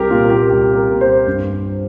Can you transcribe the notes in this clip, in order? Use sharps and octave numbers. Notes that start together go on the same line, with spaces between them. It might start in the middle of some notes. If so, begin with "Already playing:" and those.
Already playing: C2 G4 A#4
A#2 A#3 F4
A#4
G4
C2 G4
A#4
A#2 A#3
C5
G2